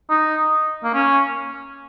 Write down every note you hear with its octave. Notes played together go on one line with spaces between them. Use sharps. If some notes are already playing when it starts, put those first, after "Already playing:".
D#4
A#3
C#4